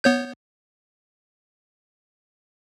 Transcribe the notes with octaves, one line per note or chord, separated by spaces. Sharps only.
B3 C#5 G6